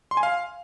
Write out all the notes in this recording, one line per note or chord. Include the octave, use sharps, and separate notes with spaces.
C6
G#5
F5